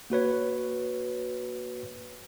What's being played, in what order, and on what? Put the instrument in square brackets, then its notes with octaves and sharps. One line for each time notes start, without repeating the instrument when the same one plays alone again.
[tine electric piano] A#3 F#4 B4 C#5